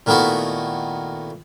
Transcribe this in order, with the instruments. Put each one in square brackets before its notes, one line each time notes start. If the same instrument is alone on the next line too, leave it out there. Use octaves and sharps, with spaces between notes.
[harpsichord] A#2 D#3 A3 B3 E4 F#4